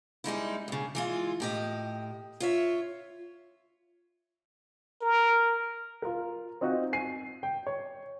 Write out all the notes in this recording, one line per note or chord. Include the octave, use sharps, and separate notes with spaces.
G3 G#3 D#4 E4
G2 C#3
E3 G#3 F4
A2 G4 D#5
F4 C#5 E5
A#4
F4 A#4
C4 D#4 F4 F#4
G#5 C7 D#7
G5
C#5